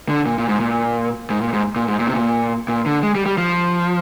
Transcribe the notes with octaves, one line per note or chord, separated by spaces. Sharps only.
D3
A#2
A#2
G#2
A#2
G#2
A#2
G#2
A#2
G#2
A#2
C3
A#2
A#2
D3
G#3
G3
G3
F3